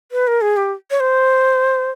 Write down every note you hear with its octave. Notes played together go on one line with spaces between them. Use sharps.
B4
A#4
G#4
G4
C#5
C5